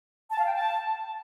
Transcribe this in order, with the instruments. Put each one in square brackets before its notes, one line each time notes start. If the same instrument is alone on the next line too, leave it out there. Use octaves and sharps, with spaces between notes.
[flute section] A5
F5
G5
A5